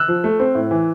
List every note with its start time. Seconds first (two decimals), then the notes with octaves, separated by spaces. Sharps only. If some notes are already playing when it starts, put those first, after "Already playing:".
Already playing: E6 F#6
0.08 F3
0.24 A3
0.40 C4
0.55 A2
0.71 E3